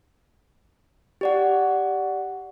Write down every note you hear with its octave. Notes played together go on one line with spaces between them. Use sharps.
G4 D5 F#5